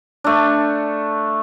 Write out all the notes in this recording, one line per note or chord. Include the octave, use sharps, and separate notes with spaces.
A3 D4